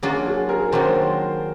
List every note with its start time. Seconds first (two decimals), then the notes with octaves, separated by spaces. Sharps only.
0.03 F#3 A#3 D4 F4 F#4 G#4
0.26 F#4 G#4
0.49 G#4 A#4
0.72 D#3 F#3 A#3 D4 A#4 C5
0.85 C5